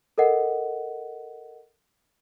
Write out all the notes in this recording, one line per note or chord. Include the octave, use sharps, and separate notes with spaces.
A4 A#4 D#5 F#5